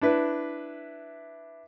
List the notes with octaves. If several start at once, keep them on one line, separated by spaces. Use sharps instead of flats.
D4 E4 B4